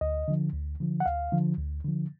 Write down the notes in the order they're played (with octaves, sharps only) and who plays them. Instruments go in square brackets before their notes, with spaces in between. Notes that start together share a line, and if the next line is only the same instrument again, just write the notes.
[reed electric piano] D2 D#5
D3 F3
D2
D3 F3
F#5
D2 F5
D3 F3
D2
D3 F3